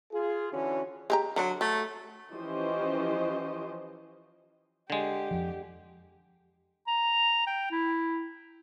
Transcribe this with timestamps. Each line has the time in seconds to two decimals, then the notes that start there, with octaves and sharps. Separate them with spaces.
0.13 F4 G#4
0.52 D3 E3 C#4 F#4
1.10 G#3 G4 A#5
1.36 D3 F#3 D4
1.61 F#3 A3
2.32 E3 F3 C#4 G4 C5 D#5
4.90 D3 G#3 G4
5.31 F2 F3
6.87 A#5
7.47 G5
7.71 E4